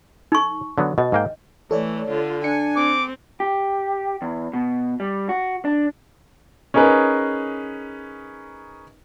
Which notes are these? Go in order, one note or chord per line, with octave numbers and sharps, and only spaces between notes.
D#4 A4 C#6
D3 F#3 B3
B2 D#5
G#2 A#3 G5
E3 A3 A4 C#5 D5
D3 F4
D4 G#5 C#7
C4 D6
G4
E2
B2
G3
F#4
D4
C#4 D#4 G#4 A#4 B4